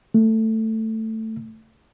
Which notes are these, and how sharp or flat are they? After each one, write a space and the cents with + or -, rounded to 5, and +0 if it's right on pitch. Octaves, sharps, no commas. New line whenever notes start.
A3 +10